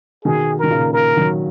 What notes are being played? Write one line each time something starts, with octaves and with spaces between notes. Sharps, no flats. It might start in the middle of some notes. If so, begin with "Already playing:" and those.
B2 D#3 G#4
D#3 A#4
A#2 C#3
A#4
D#3 F#3